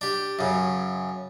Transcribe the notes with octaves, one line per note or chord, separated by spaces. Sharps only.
D4 G4
F#2 C#3